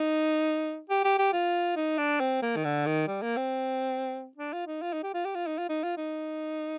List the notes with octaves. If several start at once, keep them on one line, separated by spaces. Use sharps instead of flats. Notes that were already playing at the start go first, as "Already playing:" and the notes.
Already playing: D#4
G4
G4
G4
F4
D#4
D4
C4
A#3
D#3
D3
D#3
G3
A#3
C4
D4
F4
D#4
F4
D#4
G4
F4
G4
F4
D#4
F4
D#4
F4
D#4